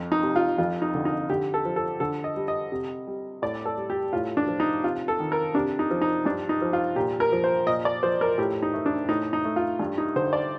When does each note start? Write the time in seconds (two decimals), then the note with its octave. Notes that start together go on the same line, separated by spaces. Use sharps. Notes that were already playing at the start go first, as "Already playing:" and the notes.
Already playing: F2
0.12 D#4
0.23 C3
0.36 F4
0.58 F2 F4
0.82 D#4
0.95 D3
1.05 D#4
1.29 D3 G4
1.54 A4
1.65 F3
1.76 A4
2.00 D3 A4
2.24 D#5
2.36 G3
2.48 D#5
2.72 C3
3.07 G3
3.42 A2 D5
3.66 A4
3.77 G3
3.90 G4
4.13 A2 F4
4.37 D4
4.48 F3
4.60 D#4
4.83 C3 F4
5.08 A4
5.20 D#3
5.32 A#4
5.54 C3 D4
5.79 D#4
5.91 F3
6.01 D#4
6.25 G2 D4
6.49 D#4
6.62 F3
6.73 F4
6.96 A#2 G4
7.20 A#4
7.32 F3
7.44 C5
7.67 A#2 D#5
7.85 D5
8.03 F3 C5
8.21 A#4
8.38 A2 G4
8.63 D#4
8.73 A3
8.86 D4
9.09 A2 D#4
9.33 D#4
9.45 A3
9.56 F4
9.79 G2
9.98 D#4
10.16 D3 C5
10.33 D5